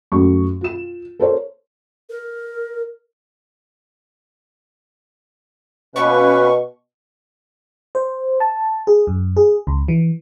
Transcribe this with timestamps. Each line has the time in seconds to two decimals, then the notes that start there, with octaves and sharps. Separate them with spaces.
0.12 F#2 A3 G4 C#6
0.61 F4 E7
1.19 A4 A#4 C5 C#5
2.10 A#4
5.96 B2 A#3 C#4 B4 C#6
7.95 C5
8.40 A5
8.87 G#4
9.07 F#2
9.37 G#4
9.67 C#2
9.88 E3